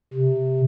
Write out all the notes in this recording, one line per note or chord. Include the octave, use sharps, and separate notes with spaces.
C3